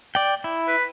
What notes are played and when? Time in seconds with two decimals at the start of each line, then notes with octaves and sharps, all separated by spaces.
0.15 D5 G5
0.44 E4
0.68 B4